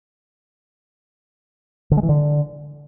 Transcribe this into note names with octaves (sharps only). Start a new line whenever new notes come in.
D3
G#3
E3
D3